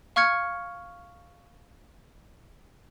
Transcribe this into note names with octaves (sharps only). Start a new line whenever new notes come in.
F5 C#6 F6 G#6 C#7